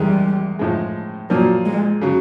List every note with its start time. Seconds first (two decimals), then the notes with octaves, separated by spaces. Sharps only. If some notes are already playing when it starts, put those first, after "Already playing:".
Already playing: E2 C3 D#3 G3 G#3
0.59 A2 F3 G#3
1.30 A#2 F3 F#3 A#3
1.65 G#3
2.01 C#3 F#3